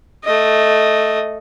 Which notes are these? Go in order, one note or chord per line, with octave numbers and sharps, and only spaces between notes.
A3 D#5